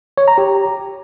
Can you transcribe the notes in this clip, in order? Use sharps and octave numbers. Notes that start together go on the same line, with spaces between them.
C#5
A#5
G4